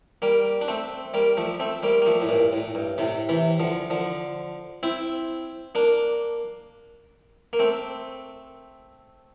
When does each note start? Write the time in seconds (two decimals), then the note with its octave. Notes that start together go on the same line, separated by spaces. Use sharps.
0.22 G3 A#3
0.61 D4
0.68 A3 C4
1.14 G3 A#3
1.37 F3 A3
1.60 A3 C4
1.83 G3 A#3
2.02 A#3
2.06 F3 A3
2.22 A2
2.29 G2 A#2
2.53 A2
2.75 G2
2.98 A2 C3
3.29 C3 E3
3.60 D3 F3
3.90 D3 F3
4.83 C4 E4
5.75 A#3 D4
7.53 A#3
7.59 A3 C4